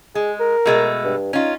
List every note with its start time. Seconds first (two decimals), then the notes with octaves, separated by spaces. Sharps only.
0.15 G#3 G#4
0.40 A#4
0.66 B2 G#3 A3
1.04 G2
1.33 C#4 D#4 F4